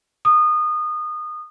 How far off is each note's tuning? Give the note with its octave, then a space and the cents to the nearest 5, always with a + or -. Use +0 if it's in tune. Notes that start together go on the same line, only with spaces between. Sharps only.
D#6 -25